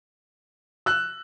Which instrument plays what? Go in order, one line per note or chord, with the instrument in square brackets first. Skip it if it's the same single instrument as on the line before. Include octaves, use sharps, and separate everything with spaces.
[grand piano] E6 F#6